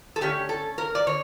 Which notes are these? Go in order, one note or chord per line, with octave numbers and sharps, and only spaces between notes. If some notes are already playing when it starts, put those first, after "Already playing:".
A4
D3 A3 C#4 G4
A4
A#4
D5
D3 C#5